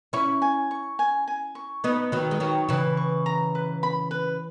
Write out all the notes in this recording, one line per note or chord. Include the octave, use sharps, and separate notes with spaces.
C#4 E4 C#6
G#5
C#6
G#5
G#5
C#6
B3 D#4 B4
D#3 F#3 B4
G#3
D#3 F#3 C#6
C#3 E3 B4
C#6
A#5
B4
B5
B4